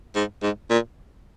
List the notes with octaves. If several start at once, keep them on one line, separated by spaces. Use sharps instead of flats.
G#2
G#2
A#2